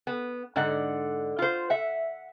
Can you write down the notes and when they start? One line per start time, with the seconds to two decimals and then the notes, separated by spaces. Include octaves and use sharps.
0.07 B3
0.56 G#2 D3 D5 F#5
1.39 F4 C5
1.70 E5 F#5